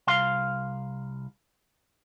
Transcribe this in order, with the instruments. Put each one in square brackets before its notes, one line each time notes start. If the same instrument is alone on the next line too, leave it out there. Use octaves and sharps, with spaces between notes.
[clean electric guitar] C2 F5 C6